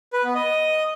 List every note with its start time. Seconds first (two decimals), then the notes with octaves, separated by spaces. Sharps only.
0.13 B4
0.24 B3
0.35 D#5